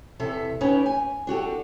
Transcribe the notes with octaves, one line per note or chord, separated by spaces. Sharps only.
E2 C3 A4 E5
C#4 D#4 G4 B4 C#5
G#5
D4 F#4 G4 A4